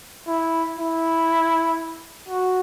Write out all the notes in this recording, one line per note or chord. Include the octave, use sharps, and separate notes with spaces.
E4
E4
F#4